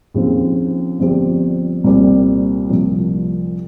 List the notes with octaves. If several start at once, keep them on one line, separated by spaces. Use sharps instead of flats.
D#2 C#3 F3 C4
G1 G2 F3 C4 G4
C2 A#2 G3 C4 G4
C2 C3 F3 A#3